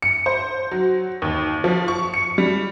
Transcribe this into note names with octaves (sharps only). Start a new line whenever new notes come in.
C#7
C5
F#3
D#2
F3
C#6
C#7
G3